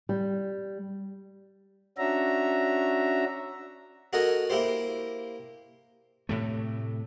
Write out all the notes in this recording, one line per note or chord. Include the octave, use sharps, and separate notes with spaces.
G3
C#4 D4 F#4 E5 A#5
F#4 A4 A#4 D#5 F#5 G#5
A#3 E4 G4 C5
A2 C3 A3